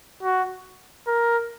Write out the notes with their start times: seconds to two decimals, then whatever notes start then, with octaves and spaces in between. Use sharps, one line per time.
0.23 F#4
1.07 A#4